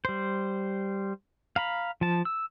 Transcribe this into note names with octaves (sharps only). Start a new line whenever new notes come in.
G3 C5
F5 A#5 B5
F3 A5
E6